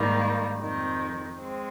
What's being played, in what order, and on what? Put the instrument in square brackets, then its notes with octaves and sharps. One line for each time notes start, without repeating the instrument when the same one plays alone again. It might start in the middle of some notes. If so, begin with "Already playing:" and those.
Already playing: [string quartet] G#2 D#3 G3 A#3
F2 C3 D#3
G#3 C4